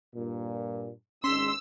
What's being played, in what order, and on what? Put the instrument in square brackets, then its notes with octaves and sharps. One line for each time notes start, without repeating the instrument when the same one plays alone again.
[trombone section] G2 A#2
[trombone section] G#1 G#3 [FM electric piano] C#4 [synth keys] C6 B6 [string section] E6